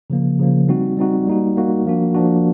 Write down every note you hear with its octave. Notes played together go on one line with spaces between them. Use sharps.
C#3 F3 A#3
C#3 F3 A#3
G3 C4 D#4 F#4
G3 C4 D#4 F#4
G3 A#3 D#4 F#4
G3 A#3 D#4 F#4
F3 A#3 D4 F#4
F3 A#3 D4 F#4